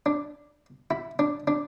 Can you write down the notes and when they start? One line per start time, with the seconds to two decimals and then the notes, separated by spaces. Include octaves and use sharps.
0.06 D4
0.91 E4
1.19 D4
1.47 D4